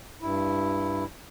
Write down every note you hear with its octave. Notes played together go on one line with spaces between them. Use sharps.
G2 E4